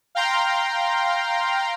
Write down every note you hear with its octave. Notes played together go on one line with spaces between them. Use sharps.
F5 G5 A#5 C6